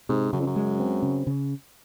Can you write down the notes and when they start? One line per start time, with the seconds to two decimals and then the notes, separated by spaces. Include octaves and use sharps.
0.09 G#2 C3
0.32 F#2 C#3
0.40 F2
0.47 F#2
0.56 G#3
0.79 C4
1.02 C#3
1.27 C#3